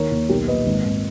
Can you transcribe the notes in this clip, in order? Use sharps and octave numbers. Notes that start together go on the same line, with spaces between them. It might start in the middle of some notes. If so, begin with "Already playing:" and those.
Already playing: D#2 D#3 A#4 C#5
D#2
B1 G4 A#4
A#2 B4 D#5
G#1
G#1